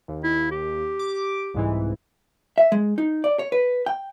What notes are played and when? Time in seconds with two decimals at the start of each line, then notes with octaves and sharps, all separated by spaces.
0.08 D#2
0.24 E4
0.51 G4
0.99 D6
1.54 C2 G#2 E3
2.58 E5
2.72 G#3
2.98 D#4
3.24 D5
3.39 C#5
3.52 B4
3.86 G5